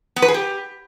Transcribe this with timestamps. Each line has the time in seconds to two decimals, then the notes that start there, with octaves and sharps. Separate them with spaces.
0.16 B3
0.22 B4
0.28 G#4
0.34 G4